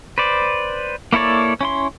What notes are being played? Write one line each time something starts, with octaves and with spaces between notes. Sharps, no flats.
B4 C5 D5
A#3 E4 A4 C#5 D5
C#4 E4 C6